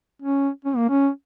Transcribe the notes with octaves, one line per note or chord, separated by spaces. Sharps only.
C#4
C#4
A#3
C#4